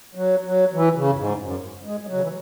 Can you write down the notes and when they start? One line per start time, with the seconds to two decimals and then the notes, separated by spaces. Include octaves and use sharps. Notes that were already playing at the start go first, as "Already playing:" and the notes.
0.15 F#3
0.44 F#3
0.73 E3
0.95 C#3
1.12 F#2
1.18 G#2
1.40 F#2
1.84 G#3
2.00 G#3
2.06 F#3
2.13 C#3
2.21 E3